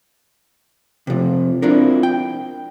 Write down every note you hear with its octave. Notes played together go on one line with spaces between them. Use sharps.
C3 F3
C4 D4 E4 F4 A#4
G5